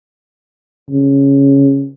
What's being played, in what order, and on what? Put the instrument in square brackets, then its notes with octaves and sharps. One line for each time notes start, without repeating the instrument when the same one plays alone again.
[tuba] C#3